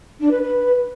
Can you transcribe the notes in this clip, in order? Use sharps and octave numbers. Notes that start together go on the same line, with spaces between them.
D4
B4
B4